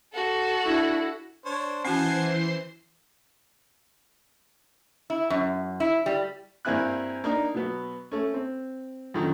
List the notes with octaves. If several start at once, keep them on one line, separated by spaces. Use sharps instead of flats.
F#4 A4
D4 E4
D4 C5 C#5
E3 C#4 F#4 C5 F#5 G#5 A5 C6
E4
F#2
E4
G3
G2 A#3 C4 E4 G#5 F#6
A#3 D4 D#4
B2 F#3 B3
A3 C#4
C4
F#2 A#2 D3 D#3 F3